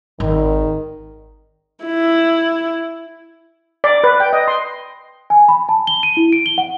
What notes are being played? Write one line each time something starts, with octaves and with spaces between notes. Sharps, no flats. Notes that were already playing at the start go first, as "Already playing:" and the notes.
G#1 D#3
E4
D5
B4
G5
D#5
C6
G#5
B5
A5
G7
D#7
E4
D7
G7
F#5